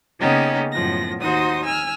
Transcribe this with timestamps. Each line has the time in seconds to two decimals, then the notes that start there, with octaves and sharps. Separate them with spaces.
0.19 C#3 A#3 B3 C#4 D#4 G4
0.72 F#2 A2 F3 B3 A#6
1.19 D#2 D#4 F#4 C5 D#6
1.65 G#5 E6 F6